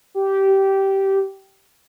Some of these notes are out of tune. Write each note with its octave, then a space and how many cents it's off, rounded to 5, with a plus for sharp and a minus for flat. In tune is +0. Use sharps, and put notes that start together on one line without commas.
G4 -15